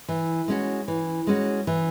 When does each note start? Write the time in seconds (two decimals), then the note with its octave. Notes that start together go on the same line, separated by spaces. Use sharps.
0.08 E3
0.48 G#3 C#4 F#4
0.88 E3
1.27 G#3 C#4 F#4
1.67 E3